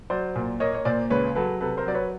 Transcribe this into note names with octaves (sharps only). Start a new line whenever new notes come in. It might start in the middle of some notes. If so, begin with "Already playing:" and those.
F#3 C5 D5
A#2
A#3 C#5 D#5
C#5
A#2 C5 D5
C#2 B4 C#5
F#3 A4 B4
C3 A4 B4
A#4 C5
F#3 D5
B4 C#5